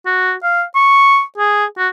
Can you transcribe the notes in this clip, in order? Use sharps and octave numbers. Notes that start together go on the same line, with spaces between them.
F#4
F5
C#6
G#4
F#4